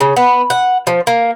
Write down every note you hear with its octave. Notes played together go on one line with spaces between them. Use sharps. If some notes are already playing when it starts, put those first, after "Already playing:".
C#3
B3
F#5
F3
A#3